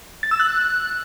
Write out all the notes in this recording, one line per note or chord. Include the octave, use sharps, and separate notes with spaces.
A6
E6
F#6